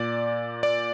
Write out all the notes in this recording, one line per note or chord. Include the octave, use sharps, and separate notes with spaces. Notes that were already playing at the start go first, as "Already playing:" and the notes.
Already playing: A#2 D5
D5